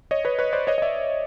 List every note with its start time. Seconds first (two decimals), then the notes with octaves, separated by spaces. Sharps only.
0.11 C#5 D#5
0.25 B4 C#5
0.39 B4 C#5
0.53 C5 D5
0.67 C#5 D#5
0.78 D#5
0.82 D5 E5